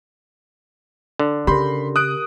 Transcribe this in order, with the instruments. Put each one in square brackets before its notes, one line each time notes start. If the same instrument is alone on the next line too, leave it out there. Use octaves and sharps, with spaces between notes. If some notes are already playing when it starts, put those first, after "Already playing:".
[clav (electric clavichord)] D3
[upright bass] C#3 [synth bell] G4 A#4 [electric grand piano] B5 C6
[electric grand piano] D#6 F#6 D7